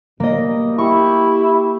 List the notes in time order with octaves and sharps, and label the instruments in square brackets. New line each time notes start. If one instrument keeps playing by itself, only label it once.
[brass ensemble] B2 G3 [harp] A#3 D#5
[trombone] E4 [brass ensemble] G4 [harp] C#6